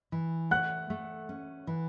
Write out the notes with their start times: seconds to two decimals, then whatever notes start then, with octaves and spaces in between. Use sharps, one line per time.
0.12 E3
0.51 A3 F#5 F#6
0.90 A3
1.29 C#4
1.67 E3